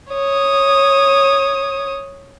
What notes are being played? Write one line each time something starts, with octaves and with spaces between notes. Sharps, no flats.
C#5 D#6